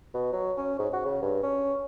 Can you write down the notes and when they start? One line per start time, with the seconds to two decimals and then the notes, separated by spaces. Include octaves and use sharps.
0.14 B2
0.33 F#3
0.57 C#4
0.79 G#2
0.93 F#4
1.05 C#3
1.22 G2
1.43 C#4